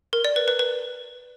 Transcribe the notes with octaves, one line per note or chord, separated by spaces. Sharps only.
A#4
D5
B4
B4
B4